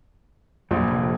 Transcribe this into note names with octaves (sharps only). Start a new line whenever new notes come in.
A#1 F2 F#3 G3
F1